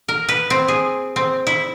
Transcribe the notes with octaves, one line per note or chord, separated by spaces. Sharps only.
A#4
B4
C4
G#4
C4
E4